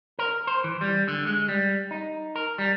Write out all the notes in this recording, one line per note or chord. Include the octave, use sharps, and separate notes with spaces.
A#4
C5
E3
G3
D3
G#3
G3
D#4
A#4
G3